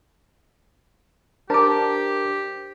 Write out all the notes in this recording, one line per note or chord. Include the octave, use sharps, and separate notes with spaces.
D4 G4 A#4 C5 A5 D6